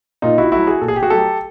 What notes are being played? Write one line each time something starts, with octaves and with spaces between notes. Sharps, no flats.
A#2 D#4 F4
E4 F#4
F#3 A3 E4 F#4
F#4 G#4
A#2 A4
G#4
G4
F#4 G#4
F#3 A3 G4 A4